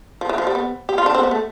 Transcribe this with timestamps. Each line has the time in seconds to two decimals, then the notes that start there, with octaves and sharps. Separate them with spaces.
0.21 F3
0.29 E3
0.38 F3
0.47 G3
0.55 B3
0.89 G4
0.98 F4
1.06 D4
1.15 C4
1.23 B3
1.31 A3